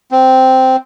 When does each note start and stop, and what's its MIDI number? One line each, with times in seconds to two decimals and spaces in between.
0.11 0.76 60